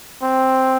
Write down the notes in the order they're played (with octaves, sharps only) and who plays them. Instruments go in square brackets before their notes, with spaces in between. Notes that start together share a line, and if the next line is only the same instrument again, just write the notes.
[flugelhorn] C4